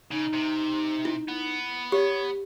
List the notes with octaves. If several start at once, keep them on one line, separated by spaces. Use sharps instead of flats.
C#3 D#4
C3
E4
B3
G4 C#5